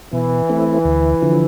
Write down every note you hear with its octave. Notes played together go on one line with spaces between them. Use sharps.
B2 E3
A3 C4 E4
D2
D3 F3